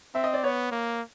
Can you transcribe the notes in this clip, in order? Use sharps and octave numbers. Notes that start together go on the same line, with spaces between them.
C4 E5
D#5
D5
B3 C#5
A#3